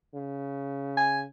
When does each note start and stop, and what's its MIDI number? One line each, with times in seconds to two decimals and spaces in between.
0.15 1.26 49
0.97 1.20 80